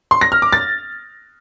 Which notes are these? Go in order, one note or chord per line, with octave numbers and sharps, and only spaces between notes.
C6
A#6
F6
D6
A6